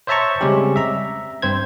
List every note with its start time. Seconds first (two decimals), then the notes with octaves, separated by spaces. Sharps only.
0.07 C5 C#5 E5 A5 A#5 C#6
0.41 C#3 G3 G#3 C4 C#4 G4
0.76 E5 A#5
1.42 G2 C4 C5 G#6